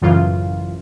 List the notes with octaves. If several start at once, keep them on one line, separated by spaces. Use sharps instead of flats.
A1 F#2 C#3 E3 F4